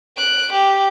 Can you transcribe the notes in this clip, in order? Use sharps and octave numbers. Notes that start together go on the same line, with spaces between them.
F#6 D7
G4